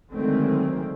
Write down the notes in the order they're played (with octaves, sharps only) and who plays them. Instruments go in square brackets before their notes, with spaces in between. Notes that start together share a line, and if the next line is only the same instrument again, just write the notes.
[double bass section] D3 D#3 F#3 G#3 A3 C4